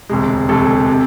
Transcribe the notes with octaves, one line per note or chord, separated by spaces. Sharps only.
E1 D2 C3 G#3
E1 D2 C3 G#3 A4
C3